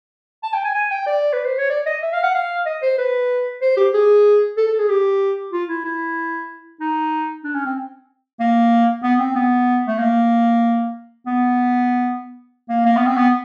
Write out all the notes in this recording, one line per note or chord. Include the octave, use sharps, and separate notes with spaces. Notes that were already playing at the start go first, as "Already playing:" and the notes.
A5
G5
G#5
G#5
G5
D5
B4
C5
C#5
D5
D#5
E5
F5
F#5
F5
D#5
C5
B4
C5
G4
G#4
A4
A4
G#4
G4
F4
E4
E4
D#4
D4
C#4
C4
A#3
B3
C4
B3
A3
A#3
B3
A#3
A#3
B3
C4
B3